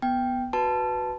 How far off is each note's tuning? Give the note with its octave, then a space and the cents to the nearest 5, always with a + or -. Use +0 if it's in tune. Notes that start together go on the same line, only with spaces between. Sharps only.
B3 +0 G5 +0
F#4 +0 B4 +0 A5 -5